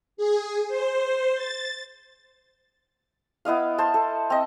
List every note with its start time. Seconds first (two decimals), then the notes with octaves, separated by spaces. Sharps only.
0.17 G#4
0.68 C5
1.35 A6
3.45 B3 E4 D#5 F5
3.78 C5 A5
3.94 A4
4.30 C4 D#5